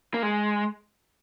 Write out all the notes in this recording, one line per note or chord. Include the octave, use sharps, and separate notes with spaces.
A#3
G#3